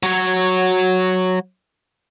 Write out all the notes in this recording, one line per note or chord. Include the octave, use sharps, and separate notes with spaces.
F#3 C#5